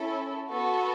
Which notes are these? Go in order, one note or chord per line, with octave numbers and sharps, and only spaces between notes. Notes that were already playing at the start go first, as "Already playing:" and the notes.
Already playing: C#4 E4 A4
B3 F#4 A4